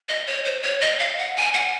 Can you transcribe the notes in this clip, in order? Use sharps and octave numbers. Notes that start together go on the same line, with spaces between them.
D#5
C#5
C5
C#5
D#5
F5
F#5
G#5
F#5